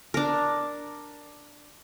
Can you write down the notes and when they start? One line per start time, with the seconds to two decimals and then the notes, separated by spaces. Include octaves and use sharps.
0.14 D4 A#4